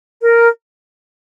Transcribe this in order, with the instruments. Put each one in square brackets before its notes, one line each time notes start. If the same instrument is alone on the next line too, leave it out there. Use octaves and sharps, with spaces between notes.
[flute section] A#4